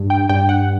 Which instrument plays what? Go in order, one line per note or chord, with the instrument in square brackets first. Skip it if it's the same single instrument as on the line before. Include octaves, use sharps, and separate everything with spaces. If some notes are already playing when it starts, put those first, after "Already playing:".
Already playing: [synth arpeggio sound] G2
G5
G2 G5
F#5